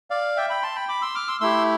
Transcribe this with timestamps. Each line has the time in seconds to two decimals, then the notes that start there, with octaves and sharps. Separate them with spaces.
0.10 D5 F5
0.37 E5 G5
0.50 G5 B5
0.63 A5 C6
0.76 G5 B5
0.89 B5 D6
1.02 C6 E6
1.15 D6 F6
1.28 C6 E6
1.41 A3 E4 G4 C6 E6